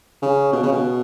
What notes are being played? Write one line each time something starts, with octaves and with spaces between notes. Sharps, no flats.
C#3
B2
C#3
B2